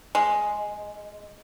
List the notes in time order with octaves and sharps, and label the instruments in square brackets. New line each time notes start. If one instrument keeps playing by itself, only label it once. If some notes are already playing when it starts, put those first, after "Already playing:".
[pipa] G#3